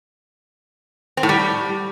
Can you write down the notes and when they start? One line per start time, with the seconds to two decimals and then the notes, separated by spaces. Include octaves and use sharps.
1.17 C4
1.23 A2
1.29 G3